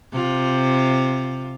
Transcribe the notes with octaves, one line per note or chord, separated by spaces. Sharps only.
C3 F4